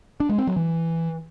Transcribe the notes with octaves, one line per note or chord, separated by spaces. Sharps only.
D4
G#3
C4
F#3
E3